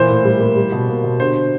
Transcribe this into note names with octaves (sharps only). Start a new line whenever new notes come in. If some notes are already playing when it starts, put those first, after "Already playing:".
Already playing: A#2 E3 C5
A2
G3
A#3
G3
B2
A#3
B2
D3 C5